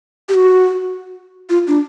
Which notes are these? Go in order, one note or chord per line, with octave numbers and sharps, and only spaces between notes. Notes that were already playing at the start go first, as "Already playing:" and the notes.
G4
F#4
F4
D4